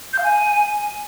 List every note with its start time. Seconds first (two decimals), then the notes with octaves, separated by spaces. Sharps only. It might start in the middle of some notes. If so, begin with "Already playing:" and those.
0.13 G6
0.18 F5
0.24 G#5